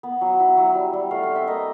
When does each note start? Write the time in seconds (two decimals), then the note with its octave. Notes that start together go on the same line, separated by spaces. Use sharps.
0.03 B3
0.21 F#3
0.40 E4
0.57 F#3
0.75 G3
0.93 G3
1.11 A3 F5
1.23 F5
1.29 C4
1.35 E5
1.47 A#3 D#5